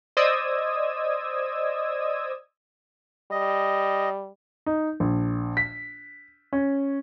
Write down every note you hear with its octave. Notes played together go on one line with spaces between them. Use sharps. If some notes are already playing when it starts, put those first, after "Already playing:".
C5 D5 D#5 D#6 E6 G#6
G3 D#5
D#4
A#1
B6
C#4